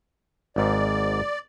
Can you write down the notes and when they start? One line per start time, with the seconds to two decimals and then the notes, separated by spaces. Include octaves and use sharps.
0.56 G#1 G#2 D5